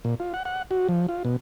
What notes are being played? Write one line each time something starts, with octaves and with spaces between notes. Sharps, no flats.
A#2
F4
F#5
F#5
F#4
F3
F4
B2